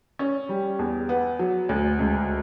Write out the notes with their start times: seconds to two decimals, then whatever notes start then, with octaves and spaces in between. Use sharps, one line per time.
0.19 C#4
0.49 G3
0.79 E2
1.09 B3
1.39 F#3
1.69 D2
1.99 C#2